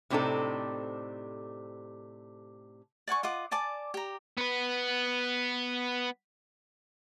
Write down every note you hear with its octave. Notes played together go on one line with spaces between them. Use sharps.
A2 C3 C4 D4 D#4 A4
D5 F#5 G#5 C#6
F4 D#5 F#5 D6
D5 G#5 A5 D6
G4 A#5
B3 B4